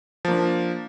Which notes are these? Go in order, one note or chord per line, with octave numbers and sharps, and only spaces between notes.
F3 A#3 D4